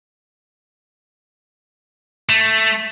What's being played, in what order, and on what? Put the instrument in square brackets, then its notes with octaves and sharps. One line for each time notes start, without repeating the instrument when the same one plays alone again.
[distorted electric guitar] A3